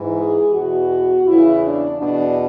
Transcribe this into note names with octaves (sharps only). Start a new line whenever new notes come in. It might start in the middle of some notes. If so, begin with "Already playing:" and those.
Already playing: G#2 E3
G#4
E2 B2 F#4
E2 C#3 E3 E4
D4
E2 B2 D4